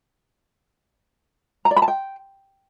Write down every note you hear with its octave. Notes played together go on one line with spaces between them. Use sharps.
A#5
D5
B5
A5
G5